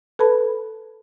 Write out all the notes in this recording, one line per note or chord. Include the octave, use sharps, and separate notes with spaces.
A4 B4 A5 B5